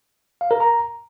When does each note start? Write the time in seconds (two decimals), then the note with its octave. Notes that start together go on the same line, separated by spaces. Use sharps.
0.41 F5
0.51 A#4
0.60 A#5